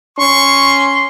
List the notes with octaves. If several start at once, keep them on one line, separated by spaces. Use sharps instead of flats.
C#4 C6 C#6